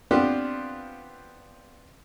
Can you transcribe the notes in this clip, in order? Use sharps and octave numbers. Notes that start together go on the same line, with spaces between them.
B3 C4 D4 F4 G4